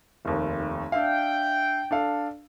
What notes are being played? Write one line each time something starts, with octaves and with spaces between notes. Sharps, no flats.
F1 D#2
D4 E5 F5 G5
D4 A4 F5